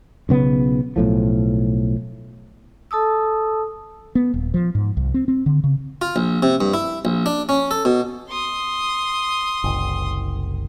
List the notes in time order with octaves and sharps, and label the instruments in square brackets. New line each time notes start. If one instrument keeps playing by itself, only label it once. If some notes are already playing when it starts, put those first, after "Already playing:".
[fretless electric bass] B1 C#3 B3
B1 A2 F3
[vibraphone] A4 A5 D#6 E6
[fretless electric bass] B3
D#1
F3
G#2
C2
C4
C4
D3
C#3
[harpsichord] F4
A#1
C3
G2
E4
A#1
D4
C#4
A4
B2
[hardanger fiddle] C6 D#6
[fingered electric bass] F#1 C2